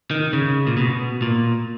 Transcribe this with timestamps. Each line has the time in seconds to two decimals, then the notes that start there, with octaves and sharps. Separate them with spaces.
0.11 D#3
0.33 C#3
0.67 A#2
0.77 B2
1.22 A#2